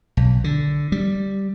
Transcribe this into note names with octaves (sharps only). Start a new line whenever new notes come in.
B1
D3
G3